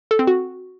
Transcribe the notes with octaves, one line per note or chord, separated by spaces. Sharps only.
A4
C4
F#4